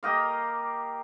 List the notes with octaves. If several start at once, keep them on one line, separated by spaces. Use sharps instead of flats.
A#3 G4 D#5 F5